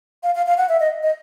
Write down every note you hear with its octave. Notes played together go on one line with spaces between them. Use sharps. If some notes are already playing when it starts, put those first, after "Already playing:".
F5
F5
F5
F#5
E5
D#5
D#5